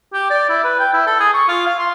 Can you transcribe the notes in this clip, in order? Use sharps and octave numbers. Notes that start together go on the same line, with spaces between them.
G4
D5
E4
B4
G5
E4
A4
G#4
C#6
F4
F5
C6